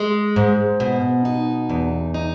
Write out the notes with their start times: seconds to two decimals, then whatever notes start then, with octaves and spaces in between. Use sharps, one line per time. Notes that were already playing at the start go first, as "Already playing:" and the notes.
Already playing: G#3
0.36 G#2
0.80 B2
1.25 D#4
1.70 E2
2.14 D#4